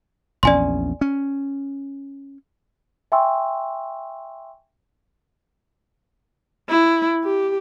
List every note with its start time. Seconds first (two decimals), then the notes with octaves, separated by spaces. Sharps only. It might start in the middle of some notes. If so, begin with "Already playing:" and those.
0.43 A#1 E2 C#4 D5 G#5 C6
1.01 C#4
3.12 E5 G5 G#5 C6 C#6 E6
6.69 E4
7.24 G4